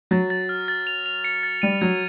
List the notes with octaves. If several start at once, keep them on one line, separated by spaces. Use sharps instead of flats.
F#3 A6
A6
F6
A6
F7
F7
C#7
A6
G3 D#7
F#3 G#6